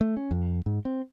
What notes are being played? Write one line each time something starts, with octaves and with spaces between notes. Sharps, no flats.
A3
C#4
F2
G#2
C4